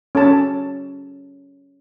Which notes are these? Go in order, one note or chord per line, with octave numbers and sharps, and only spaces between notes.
C#4 A4 A5